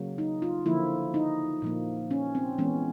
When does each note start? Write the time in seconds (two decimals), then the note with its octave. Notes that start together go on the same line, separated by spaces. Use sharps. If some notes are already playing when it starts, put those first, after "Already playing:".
Already playing: C#3 F#3 A#3
0.18 D#4
0.42 F4
0.66 D3 F3 A#3 E4
1.14 D#4
1.62 A#2 F3 A#3
2.11 C#4
2.35 C4
2.58 E3 G#3 B3 C#4